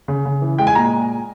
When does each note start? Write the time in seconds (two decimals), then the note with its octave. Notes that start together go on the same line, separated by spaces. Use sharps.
0.08 C#3
0.26 C#3
0.41 E3
0.58 G#3 G5
0.67 G#5
0.75 A#2 A#5